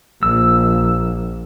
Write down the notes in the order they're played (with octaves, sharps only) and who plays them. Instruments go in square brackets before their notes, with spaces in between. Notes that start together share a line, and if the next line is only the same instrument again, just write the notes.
[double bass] A#1 [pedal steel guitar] E6